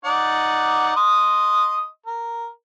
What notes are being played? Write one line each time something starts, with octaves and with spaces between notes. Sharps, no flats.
D#4 D5 F#5
D#5 C6 D#6
A#4